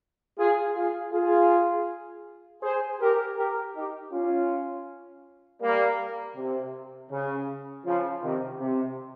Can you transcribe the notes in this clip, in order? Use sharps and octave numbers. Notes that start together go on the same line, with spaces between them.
F4 G#4
F4 G#4
F4 G#4
G#4 C5
G4 A#4
G4 A#4
D#4 G4
C#4 F4
G3 A#3
C3
C#3
C#3 F3
C3 D#3
C3